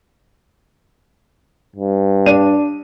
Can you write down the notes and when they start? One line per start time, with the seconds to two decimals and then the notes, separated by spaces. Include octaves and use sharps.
1.76 G2
2.26 D4 D#7